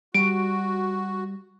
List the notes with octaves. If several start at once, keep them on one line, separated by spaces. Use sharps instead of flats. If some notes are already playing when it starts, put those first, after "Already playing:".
G3 F#4 D7